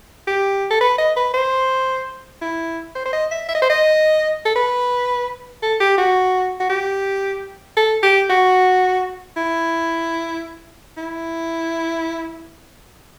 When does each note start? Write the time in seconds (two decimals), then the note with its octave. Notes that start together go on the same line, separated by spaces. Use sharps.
0.27 G4
0.71 A4
0.81 B4
0.99 D#5
1.16 B4
1.34 C5
2.42 E4
2.95 C5
3.05 C5
3.13 D#5
3.31 E5
3.49 E5
3.55 D#5
3.62 C5
3.70 D#5
4.46 A4
4.56 B4
5.63 A4
5.80 G4
5.98 F#4
6.60 F#4
6.70 G4
7.77 A4
8.03 G4
8.30 F#4
9.37 E4
10.97 E4